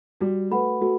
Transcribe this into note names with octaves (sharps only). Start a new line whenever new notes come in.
G3 F#4
A3 B4 F#5 B5
A3 F#4